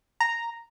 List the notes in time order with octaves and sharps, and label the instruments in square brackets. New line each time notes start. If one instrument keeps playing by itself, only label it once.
[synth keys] A#5